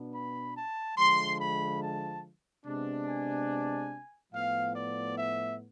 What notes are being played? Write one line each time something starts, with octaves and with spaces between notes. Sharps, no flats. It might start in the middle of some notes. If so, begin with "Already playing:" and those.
Already playing: B2 B3 D4
B5
A5
D3 F3 G#3 C6
B5
A5
C3 G#3 B3 D4
G#5
A2 F3 B3 F5
D5
E5